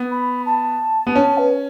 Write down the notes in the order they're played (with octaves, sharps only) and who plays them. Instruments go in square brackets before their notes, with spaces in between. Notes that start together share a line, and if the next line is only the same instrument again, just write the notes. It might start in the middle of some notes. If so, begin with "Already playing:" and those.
Already playing: [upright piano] B3
[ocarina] B5
A5
[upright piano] B3
[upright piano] C#4 [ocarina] A5
[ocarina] B4